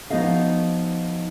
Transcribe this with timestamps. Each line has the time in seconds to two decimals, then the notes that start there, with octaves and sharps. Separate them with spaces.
0.10 F3 B3 D#4 F#4 D#5 F5